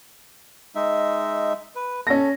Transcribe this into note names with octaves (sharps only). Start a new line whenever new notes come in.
G#3 D#4 E5
B4
C#4 A4 A#6